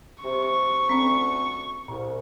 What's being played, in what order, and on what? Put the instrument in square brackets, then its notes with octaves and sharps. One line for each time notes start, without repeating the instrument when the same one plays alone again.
[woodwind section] C3 [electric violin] C#6
[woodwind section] D2 [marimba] C4 C#4
[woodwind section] C2 [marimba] A#2